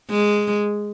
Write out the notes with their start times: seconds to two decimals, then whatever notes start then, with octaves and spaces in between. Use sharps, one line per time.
0.10 G#3